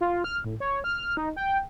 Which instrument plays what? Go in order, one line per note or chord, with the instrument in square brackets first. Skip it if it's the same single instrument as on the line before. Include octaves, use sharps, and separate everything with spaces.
[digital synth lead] F4
F6
A2
C#5
F6
D#4
G5